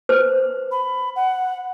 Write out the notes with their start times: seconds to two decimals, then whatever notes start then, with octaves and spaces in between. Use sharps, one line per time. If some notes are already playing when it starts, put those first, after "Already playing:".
0.09 B4 C5
0.71 B5
1.16 F#5